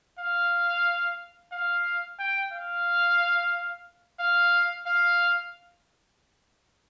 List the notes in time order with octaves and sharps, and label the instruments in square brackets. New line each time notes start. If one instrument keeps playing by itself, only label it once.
[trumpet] F5
F5
G5
F5
F5
F5